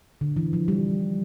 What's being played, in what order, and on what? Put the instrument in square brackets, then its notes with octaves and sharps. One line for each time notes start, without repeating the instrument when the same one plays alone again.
[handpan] D3
E3
F3
G3